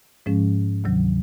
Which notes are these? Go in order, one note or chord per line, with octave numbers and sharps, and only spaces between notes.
G#2 F3 G#3 C#4
D2 C3 D#3 F#3